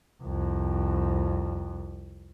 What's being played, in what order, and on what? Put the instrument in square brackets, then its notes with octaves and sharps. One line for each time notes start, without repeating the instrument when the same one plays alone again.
[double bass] C2 F2